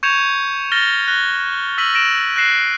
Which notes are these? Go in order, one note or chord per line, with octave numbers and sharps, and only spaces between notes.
C#6 G6 G#6 C#7 E7 F7
F6 A6 A#6 G7
F#6 A#6 G7
E6 A#6 B6 D#7 F#7
A#6 D7 E7 F#7
F#6 A#6 C7 E7